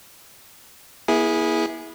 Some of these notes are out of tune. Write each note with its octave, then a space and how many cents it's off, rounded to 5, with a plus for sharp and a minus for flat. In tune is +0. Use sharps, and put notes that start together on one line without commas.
B3 -45 E4 -15 G#4 +0